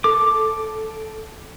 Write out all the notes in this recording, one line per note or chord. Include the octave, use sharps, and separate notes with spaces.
A4 D6